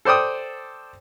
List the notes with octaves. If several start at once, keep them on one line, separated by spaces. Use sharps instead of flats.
A4 C5 D5 G5 D#6